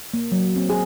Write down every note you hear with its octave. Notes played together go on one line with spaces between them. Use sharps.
A#3
F#3
C4
G#4